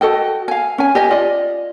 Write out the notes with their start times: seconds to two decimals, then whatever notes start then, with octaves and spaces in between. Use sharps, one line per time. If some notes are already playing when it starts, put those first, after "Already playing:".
0.01 F#4 A4 D#5 G5
0.48 F5 G#5
0.78 C#4 G#5
0.95 G4 D#5 G#5
1.11 F4 D5 D#5